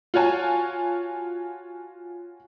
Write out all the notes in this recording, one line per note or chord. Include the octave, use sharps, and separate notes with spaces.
F4 F#4 C#5 G#5 A5